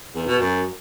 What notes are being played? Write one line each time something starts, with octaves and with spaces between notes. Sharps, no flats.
E2
B2
F#2